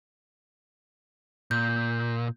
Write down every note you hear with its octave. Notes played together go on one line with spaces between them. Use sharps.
A#2 G6